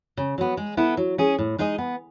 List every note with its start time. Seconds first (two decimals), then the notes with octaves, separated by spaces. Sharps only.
0.17 C#3
0.38 F#3 B3
0.57 G#3
0.77 B3 E4 A4
0.97 F#3
1.18 C#4 G#4
1.39 A2
1.59 G#3 D#4 G#4 D#5
1.78 B3